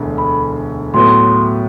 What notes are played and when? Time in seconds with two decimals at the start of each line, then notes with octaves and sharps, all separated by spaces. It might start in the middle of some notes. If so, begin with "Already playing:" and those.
Already playing: E1 D2 D3
0.18 B5
0.94 A2 F#3 B3 C6